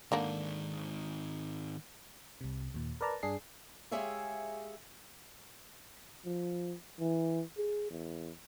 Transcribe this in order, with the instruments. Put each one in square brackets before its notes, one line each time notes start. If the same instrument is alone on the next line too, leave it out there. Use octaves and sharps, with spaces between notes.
[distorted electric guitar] G#2 D#3 [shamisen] D3 A#3 D4
[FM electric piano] C2 C3
D#2 A#2
A#4 B4 D5 A5 A#5
G2 D4 G#4 C7
[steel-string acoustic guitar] G#3 G4 G#4 C#5 E5 F5
[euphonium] F3
E3
G#4
E2